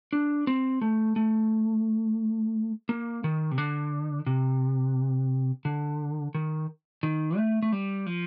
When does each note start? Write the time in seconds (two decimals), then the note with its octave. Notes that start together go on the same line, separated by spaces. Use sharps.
0.13 D4
0.47 C4
0.82 A3
1.16 A3
2.89 A#3
3.24 D#3
3.51 C3
3.58 D3
4.27 C3
5.65 D3
6.35 D#3
7.03 D#3
7.37 A3
7.62 A3
7.72 G3
8.06 F3